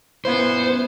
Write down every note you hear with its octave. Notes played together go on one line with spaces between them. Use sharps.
F#2 A#2 B3 E4 C5